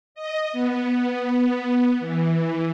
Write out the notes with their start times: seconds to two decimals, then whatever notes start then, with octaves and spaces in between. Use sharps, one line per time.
0.15 D#5
0.53 B3
2.00 E3